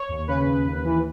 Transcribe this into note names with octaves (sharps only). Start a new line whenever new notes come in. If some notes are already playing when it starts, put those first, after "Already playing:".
Already playing: C#5
D#2
C#3 B4
D#2
D#2
E3